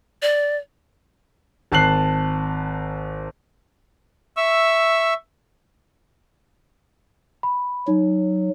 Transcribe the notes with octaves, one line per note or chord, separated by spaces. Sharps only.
D5
G#1 A5 F#6 C7 F#7
E5 C#6 E6
B5
F#3 D#4